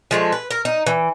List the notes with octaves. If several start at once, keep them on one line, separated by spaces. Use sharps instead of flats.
F3 G#3 A3
B4
A#4
D#4
E3